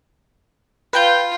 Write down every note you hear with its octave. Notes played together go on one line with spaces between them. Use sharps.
F4 B4 G5 G6